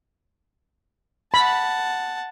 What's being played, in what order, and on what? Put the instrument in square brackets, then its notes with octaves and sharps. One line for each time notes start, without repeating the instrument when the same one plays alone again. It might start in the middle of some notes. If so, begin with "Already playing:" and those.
[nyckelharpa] F#5 A5 [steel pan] B5